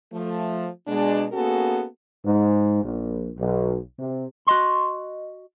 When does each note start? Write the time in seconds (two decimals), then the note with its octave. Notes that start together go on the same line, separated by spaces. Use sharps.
0.13 F3 A3
0.88 B2 G#3 D4
1.33 A#3 B3 C#4 F#4 G#4 A4
2.26 G#2
2.84 A#1
3.39 B1
3.99 C3
4.47 F#4 D#5 C6